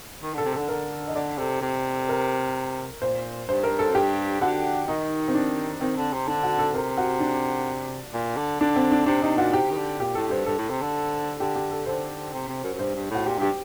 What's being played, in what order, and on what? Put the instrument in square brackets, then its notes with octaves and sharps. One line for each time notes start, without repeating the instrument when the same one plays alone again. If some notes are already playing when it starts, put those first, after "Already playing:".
[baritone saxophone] D#3
[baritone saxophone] D3 [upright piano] A4
[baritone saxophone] C3
[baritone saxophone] D3 [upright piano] A4
[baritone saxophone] D3 [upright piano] A#4
[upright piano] D#5
[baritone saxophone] D3 [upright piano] D5
[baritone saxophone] C3 [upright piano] A4
[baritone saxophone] C3
[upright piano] A#4
[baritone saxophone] A#2 [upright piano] C5
[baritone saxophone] G2 [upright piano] C5
[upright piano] A#4
A4
[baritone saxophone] F#2
[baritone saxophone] G2 [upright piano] G4
[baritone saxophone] D3 [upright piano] F#4
[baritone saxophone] D#3 [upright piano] D#4
[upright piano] C4
D4
[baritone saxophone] D#3 [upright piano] C4
[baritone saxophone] D3
C3
[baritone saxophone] D3 [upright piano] D4
[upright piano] F#4
A4
[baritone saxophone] C3 [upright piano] A#4
[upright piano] F#4
D4
[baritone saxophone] A#2
D3
[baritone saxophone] D3 [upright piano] D4
[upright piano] C4
D4
[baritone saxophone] C3 [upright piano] D4
[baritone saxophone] C3 [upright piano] D#4
[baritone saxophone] A#2 [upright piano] F#4
[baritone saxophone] C3 [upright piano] G4
[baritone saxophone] D#3
D3
[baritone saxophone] A#2 [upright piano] G4
[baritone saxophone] A2 [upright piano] A4
[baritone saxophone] G2 [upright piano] C5
[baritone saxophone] G2 [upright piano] A4
[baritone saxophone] A2
C3
D3
[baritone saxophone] D3 [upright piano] G4
[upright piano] G4
A4
[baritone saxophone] D3 [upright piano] C5
[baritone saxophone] C3
C3
F#2
F#2
[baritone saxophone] G2 [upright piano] C5
[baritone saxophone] G2
[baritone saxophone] A2 [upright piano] F#4
[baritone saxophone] A#2 [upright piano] G4
[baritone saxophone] G2 [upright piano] G4